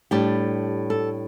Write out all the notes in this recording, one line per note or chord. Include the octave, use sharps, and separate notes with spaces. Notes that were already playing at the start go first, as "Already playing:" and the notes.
A2 G3 D4 G4
A4